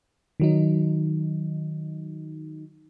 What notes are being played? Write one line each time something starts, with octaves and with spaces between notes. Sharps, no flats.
D#3 F#3 D#4